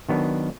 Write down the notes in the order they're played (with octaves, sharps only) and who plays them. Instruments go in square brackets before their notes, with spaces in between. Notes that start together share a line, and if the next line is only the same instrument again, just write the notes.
[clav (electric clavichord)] D#3 F#3 B3 D4